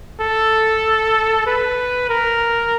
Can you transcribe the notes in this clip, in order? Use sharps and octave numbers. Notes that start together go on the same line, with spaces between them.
A4
B4
A#4